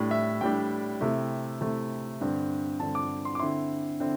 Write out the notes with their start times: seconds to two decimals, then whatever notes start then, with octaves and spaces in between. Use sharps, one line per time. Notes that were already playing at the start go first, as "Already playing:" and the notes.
Already playing: A2 G3 D4
0.11 E5
0.41 A2 G3 D4 G5
1.01 C3 A3 E4
1.61 C3 A3 E4
2.21 G2 D3 C4
2.80 G2 D3 C4 A5
2.95 D6
3.25 C6
3.35 D6
3.39 D3 C4 E4 C6
4.00 D3 C4 E4